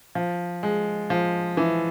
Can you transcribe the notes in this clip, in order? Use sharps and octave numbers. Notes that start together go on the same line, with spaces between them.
F3
G#3
F3
E3